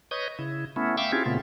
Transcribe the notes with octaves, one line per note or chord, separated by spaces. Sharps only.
B4 C#5 D#5 C#6 D#6 G6
C#3 E4
A3 B3 C#4 E4
E5 F5 G5 C#6 D6 E6
C4 C#4 E4 F4 G4 G#4
A#2 C#3 A3 B3 C4 F4